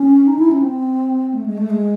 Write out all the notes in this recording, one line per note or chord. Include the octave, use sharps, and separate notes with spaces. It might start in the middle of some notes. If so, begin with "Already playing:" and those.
Already playing: C#4
D#4
E4
C#4
C4
A3
G#3
A3
G#3